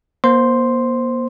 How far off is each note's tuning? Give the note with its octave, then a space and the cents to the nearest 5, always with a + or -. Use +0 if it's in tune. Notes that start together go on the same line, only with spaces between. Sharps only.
A#3 +35 C5 +0 C6 +0